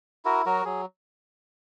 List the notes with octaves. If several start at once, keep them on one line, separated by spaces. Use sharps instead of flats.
E4 F#4 A#4
F#3 F#4 A#4
F#3 G#4